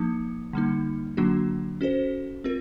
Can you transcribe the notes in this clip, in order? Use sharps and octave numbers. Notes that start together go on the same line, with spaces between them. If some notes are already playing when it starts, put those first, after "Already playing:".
Already playing: F3 A#3 D#4
D3 G3 A#3 D#4
D3 F#3 A#3 D4 F#4
C#4 F#4 A4 C5
C4 F4 A#4